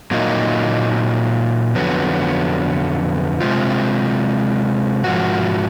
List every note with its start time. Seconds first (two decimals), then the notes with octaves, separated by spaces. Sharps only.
0.11 A#2 F#3 A#3 D#4
1.75 F2 D3 F#3 B3
3.41 C3 D#3 G#3 C4 F4
5.04 G#2 F3 F#4